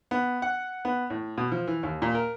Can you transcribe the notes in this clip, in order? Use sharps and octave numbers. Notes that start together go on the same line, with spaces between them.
B3
F#5
B3
A2
B2
F3
E3
D#2
A#2
A#4